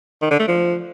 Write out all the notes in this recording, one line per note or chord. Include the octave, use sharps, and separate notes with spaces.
D#3
D3
A3
F3